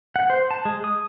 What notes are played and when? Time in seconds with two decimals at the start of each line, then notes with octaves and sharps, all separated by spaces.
0.16 F#5
0.30 C5
0.51 A5
0.65 G#3
0.84 D#6